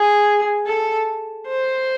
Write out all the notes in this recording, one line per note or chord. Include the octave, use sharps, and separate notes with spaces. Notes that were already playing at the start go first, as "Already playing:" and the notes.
Already playing: G#4
A4
C5